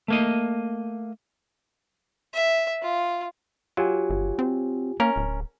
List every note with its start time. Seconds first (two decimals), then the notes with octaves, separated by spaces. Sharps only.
0.08 A3 A#3 D#5
2.34 E5
2.82 F4
3.77 F#3 F4 G4 G#5
4.10 G1
4.39 C4
5.00 A#3 C#4 A#4
5.16 D1